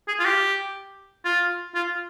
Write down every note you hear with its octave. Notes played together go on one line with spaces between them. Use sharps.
G#4
F4
G4
F4
F4